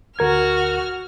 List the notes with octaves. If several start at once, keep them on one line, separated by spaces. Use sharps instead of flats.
D2 F#4 A#4 F6 G#6